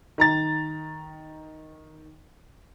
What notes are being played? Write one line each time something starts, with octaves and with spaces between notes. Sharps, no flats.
D#3 A#5 A6